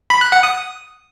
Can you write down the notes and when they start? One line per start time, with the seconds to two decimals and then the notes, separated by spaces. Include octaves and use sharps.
0.10 B5
0.21 F#6
0.32 F#5
0.43 D#6